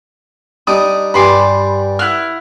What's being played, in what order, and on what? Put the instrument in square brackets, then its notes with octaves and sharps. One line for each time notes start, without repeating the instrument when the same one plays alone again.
[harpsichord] G3 D4 D#4 [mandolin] D#6
[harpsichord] G2 G3 G#5 [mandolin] B5 C6 D6
[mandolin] E4 F#5 F6